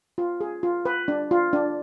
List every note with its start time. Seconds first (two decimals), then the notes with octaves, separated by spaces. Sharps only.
0.18 F4
0.41 G#4
0.63 F4
0.85 B4
1.08 D4
1.31 F4
1.53 D4